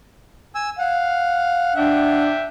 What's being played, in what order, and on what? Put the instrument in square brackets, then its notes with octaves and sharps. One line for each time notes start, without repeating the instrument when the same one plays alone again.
[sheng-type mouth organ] G#5 E6
[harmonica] F5 [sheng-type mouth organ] F#5
[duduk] D4 [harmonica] E5 G5